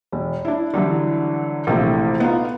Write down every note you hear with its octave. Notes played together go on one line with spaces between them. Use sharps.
E1
D4 E4
D3 E3 F#3 G3
A#1 C3 E3 A3
B3 D#4 F4